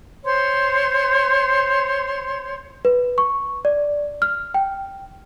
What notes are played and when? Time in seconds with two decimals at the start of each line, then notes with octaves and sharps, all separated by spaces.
0.25 C5 C#5 C6
2.85 B4
3.18 C#6
3.65 D5
4.22 F6
4.54 G5